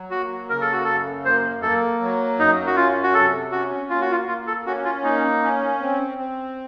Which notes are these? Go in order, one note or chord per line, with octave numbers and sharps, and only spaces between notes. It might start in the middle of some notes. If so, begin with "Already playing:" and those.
Already playing: F#3
A#3 F#4
C#3 A#4
A4
F#4
F#2 A4
A#3 C5
A#3 A4
F#3
F#2 D#4
F#4
C#4 F4
F#4
C3 A4
C#4 F#4
A#3 F4
F#4
F4
A#3 F4
A4
C#4 F#4
F4
A#3 D#4
C#4
C4
C4